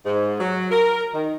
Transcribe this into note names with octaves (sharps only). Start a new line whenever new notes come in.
G#2
F#3
A#4
D#3